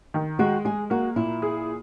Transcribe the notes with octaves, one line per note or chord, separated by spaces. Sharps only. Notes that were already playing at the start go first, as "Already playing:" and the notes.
D#3
G#3 F#4
G#3 G#4
A#3 F#4
A#2 E4
G#4